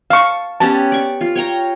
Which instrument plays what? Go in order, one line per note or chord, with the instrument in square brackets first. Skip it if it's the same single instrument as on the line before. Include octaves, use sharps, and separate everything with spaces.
[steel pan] F5 C#6 [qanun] A5
[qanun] B3 C#4 G4 [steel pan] A5
[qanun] D5 C#6
F4
C#5 G5 A#5